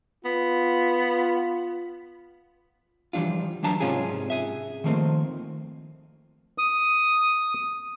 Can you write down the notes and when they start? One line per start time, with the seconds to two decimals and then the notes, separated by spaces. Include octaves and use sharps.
0.25 B3 F4
3.13 E3 F3 G3 D4 F4
3.63 E3 F#3 D4 A5 A#5
3.80 G#2 C3 C#4 F4 G#4
4.30 G#4 E5
4.84 D#3 F3 A3 A#3 C4
6.58 D#6